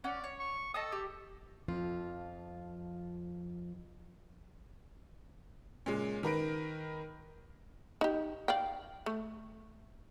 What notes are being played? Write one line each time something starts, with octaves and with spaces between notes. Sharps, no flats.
C#4 D5 F#5
C#5
C#6
A4 D#5 A5 D#6
G4
F2 F3 F4
A#2 C#3 G#3
D#3 A#4 B4 D7
D#4 G4
D5 F5 G5
A3